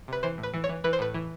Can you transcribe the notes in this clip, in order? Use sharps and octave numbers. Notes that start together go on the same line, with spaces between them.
C3 B4
E3 C5
A2
B4
E3
C#5
E3
E3 B4
C5
A2 B4
E3